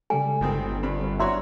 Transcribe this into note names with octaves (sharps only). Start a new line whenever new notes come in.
C#3 G3 G#3 A4 G#5
G1 B2 D#3 C4
G2 C4 B5
D4 E4 F#4 C#5 E5 C6